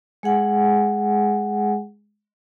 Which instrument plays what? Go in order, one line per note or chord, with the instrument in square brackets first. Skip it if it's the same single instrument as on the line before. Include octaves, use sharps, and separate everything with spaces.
[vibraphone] G#3 G#4 F#5 G#5